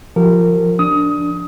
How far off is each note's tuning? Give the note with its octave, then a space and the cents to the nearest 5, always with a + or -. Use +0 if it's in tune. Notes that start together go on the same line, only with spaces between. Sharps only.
F3 +0 G4 -15 A#4 -25
D4 +0 D#6 +20